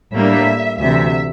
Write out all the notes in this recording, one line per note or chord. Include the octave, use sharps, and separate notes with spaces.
A2 G3 A#3 D4 E5
D2 C3 E3 E5